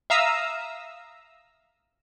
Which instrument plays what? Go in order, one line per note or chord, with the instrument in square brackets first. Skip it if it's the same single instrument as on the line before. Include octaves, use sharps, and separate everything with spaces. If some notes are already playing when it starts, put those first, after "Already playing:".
[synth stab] E5 F5 A#5 D#6 E6